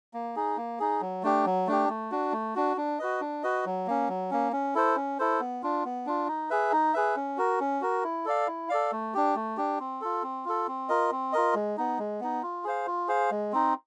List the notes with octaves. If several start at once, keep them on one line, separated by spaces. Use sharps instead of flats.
A#3
D#4 G#4
A#3
D#4 G#4
F#3
A3 D4 G4
F#3
A3 D4 G4
A3
D4 F#4
A3
D4 F#4
D4
F#4 B4 D#5
D4
F#4 B4 D#5
F#3
A#3 C#4
F#3
A#3 C#4
C#4
E4 A4 C5
C#4
E4 A4 C5
B3
D4 F4
B3
D4 F4
D#4
G#4 B4 E5
D#4
G#4 B4 E5
C#4
F#4 A#4
C#4
F#4 A#4
E4
A4 D5 F5
E4
A4 D5 F5
A3
D4 G4
A3
D4 G4
C4
F4 A4
C4
F4 A4
C4
F4 A#4 D#5
C4
F4 A#4 D#5
G#3
B3 D#4
G#3
B3 D#4
F4
G#4 C5 F5
F4
G#4 C5 F5
G#3
C4 D#4